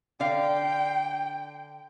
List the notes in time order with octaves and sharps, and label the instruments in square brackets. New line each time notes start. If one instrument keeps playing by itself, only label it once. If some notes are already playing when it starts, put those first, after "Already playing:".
[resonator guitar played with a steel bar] D3 D5 F5 [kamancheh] G5